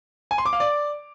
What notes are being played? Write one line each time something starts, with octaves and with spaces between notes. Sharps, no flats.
G#5
C6
D6
F5
D5